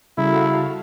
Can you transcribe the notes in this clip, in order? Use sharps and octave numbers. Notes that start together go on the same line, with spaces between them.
C#3 G3 E4 F#4 A4 F5